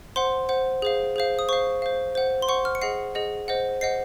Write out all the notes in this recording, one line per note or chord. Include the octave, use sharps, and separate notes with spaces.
C5 F#5 C6
C5 F#5
G#4 C5 F5
G#4 C5 F5
D#6
C5 F5 C#6
C5 F5
C5 F#5
C6
C5 F#5 C#6
F6
C#7
G#4 D#5 F#5 C7
G#4 D#5 F#5
C5 D#5 F#5
C5 D#5 F#5 C7